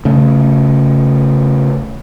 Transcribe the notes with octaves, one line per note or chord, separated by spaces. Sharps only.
C#3 A3